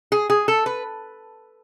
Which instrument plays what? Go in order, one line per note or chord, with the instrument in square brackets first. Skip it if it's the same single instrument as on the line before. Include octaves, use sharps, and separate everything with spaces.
[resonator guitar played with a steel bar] G#4
G#4
A4
B4